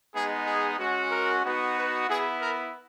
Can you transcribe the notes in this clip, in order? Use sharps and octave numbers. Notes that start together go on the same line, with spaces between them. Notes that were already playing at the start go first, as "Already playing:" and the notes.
G#3 B3 D#4 G#4
G#4
G#3 C#4 F#4
A#4
B3 D#4 F#4
B4
B3 E4 G#4
A#4